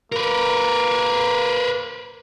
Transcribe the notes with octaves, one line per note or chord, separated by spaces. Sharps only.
A#3 A#4 B4